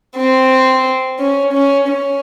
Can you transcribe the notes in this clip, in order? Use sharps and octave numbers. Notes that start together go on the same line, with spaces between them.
C4
C#4
C#4
C#4